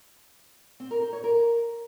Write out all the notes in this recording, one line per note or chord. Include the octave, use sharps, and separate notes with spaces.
C4
A#4
C5
C#5
A#4